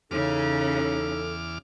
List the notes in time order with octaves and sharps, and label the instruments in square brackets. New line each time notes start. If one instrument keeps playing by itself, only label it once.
[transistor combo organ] E2 D6 F6 [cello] C#3 C#4 [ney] D#4 [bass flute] A4